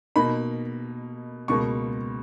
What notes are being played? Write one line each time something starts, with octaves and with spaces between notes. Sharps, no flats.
B2 A#3 D#4 B5
C#2 B2 A#3 C#6